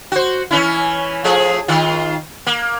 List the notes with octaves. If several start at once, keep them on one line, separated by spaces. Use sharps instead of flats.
F#4 C5
E3 C#4 E4
F3 A3 G#4
D#3 F4
A#3